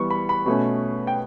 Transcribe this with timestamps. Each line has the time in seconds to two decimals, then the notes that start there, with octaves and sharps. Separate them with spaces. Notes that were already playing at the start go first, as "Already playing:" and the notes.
Already playing: E3 G3 B3 C#6
0.10 B5
0.29 B5
0.46 B2 A3 C#4
1.07 G5